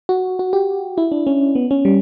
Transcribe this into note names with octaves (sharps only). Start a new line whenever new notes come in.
F#4
F#4
G4
E4
D4
C#4
B3
C#4
G3